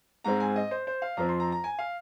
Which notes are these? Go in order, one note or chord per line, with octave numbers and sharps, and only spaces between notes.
G#2 G#3 C4 A#5
G#5
D#5
C5
C5
F5
F2 F3 C4 A#5
C6
A#5
A#5
G#5
F5